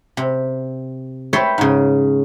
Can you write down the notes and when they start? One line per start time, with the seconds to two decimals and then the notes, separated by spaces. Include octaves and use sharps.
0.17 C3
1.33 B4 C#5 E5 G5 A5 C6
1.58 G#2 C#3